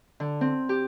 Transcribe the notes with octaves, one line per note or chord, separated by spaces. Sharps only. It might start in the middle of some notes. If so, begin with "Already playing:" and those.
D3
C4
G4